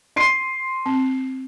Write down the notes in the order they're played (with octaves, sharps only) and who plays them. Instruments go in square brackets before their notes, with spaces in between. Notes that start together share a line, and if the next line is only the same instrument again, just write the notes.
[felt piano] C6 C7 D#7
[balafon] C4